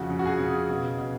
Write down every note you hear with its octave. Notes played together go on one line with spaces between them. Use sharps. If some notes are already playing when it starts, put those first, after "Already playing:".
Already playing: F2 C#3 F#4
C#3
F#4
G#4
C#3
B2
B2